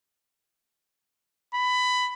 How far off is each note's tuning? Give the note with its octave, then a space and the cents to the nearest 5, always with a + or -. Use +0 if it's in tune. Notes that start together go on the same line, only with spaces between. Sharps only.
B5 +15